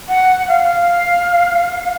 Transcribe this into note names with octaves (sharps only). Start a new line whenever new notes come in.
F#5
F5